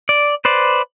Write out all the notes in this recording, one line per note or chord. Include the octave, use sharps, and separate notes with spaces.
D5
B4 C5 D5